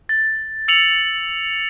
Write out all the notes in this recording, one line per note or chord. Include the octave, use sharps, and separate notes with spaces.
A6
E6 C#7 F7 F#7